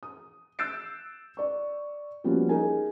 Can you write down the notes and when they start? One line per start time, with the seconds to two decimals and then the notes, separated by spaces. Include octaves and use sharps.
0.03 D#6
0.59 E6 F#6 G6 A6 C7 D7
1.37 D5 C#6
2.24 F3 G3 A#3 B3 C#4 F#4
2.49 D#4 G#4 A#4 G#5